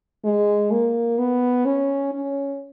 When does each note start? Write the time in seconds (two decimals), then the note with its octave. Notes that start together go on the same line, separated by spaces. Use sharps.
0.24 G#3
0.71 A#3
1.19 B3
1.66 C#4
2.13 C#4